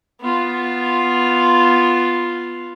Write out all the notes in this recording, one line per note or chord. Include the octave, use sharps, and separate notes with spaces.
B3 F4